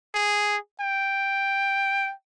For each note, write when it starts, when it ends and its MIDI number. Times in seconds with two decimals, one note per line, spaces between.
0.15 0.57 68
0.81 2.12 79